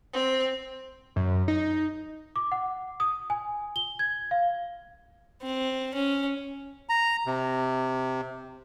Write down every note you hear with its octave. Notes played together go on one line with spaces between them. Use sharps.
C4
F#2
D#4
D6
F#5
D#6
G#5
G7
G#6
F5
C4
C#4
A#5
C3